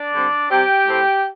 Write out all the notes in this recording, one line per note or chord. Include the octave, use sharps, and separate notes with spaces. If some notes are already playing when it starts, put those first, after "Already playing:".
Already playing: D4 D5
D3 G3 C4
C3 G3 C4 G4 G5
A2 A3 C4